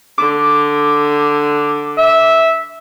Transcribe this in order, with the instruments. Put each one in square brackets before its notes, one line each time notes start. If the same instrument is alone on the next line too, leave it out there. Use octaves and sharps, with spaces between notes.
[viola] D3 [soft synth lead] D6
[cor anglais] E5